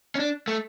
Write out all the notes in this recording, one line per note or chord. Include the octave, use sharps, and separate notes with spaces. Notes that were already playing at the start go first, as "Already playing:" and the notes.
C#4
D4
A3